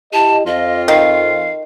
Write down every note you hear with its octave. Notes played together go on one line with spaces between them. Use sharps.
E4 G4 D#5 A5
F2 F4 D#5
D#3 F5